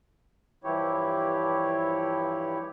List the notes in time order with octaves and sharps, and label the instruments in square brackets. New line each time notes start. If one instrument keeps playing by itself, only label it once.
[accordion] G2 E3 F3 E4 G4 C#5